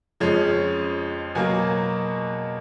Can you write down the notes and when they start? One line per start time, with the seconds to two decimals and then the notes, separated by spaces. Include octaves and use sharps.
0.20 F2 F3 G#3 C#4
1.35 B2 F#3 A#3 G#5